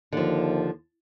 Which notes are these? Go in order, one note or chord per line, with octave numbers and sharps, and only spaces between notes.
D#2 D3 F3